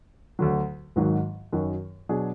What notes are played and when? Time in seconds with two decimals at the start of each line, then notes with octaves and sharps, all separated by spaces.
0.39 D2 D3 F#3
0.96 G#1 G#2 D#3 F#3
1.53 F#2 D#3 F#3
2.09 B2 F#3 D4 G#4